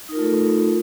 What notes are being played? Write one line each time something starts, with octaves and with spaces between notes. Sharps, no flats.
A3 D#4 F4 A4 A#4